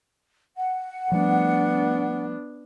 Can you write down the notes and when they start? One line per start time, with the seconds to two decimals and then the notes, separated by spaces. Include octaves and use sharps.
0.56 F#5
1.12 F3 G3 A3 B3 D4